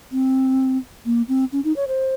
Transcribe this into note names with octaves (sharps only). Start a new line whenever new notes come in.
C4
A#3
C4
C#4
D#4
C#5
C5